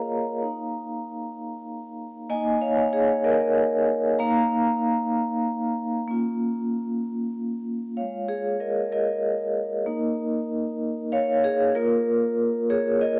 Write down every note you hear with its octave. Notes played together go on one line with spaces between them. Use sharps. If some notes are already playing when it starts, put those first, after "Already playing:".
Already playing: A#3 F4 G#4 A#4 C#5 D#5 F5 A#5
A#3 D#4
A#3 D#4 D#5 G#5
C#5 F5
G#4 C#5
A#4 D#5
A#3 D#4 F5 A#5
A#3 C#4 F4
G#3 F4 C#5 F5
G#4 C#5
A#4 D#5
A#4 D#5
A#3 D#4
C#5 F5
G#4
A#3 F4 A#4
G#4 C#5
A#4 D#5